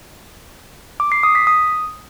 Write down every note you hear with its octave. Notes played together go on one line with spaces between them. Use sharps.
D6
C7
D#6
B6
D#6